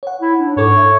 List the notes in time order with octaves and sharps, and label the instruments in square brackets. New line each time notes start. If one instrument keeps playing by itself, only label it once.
[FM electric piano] C#5 F#5
[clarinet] E4
D4
[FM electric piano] G#2 A4 D6 [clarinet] C#5
[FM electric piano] E5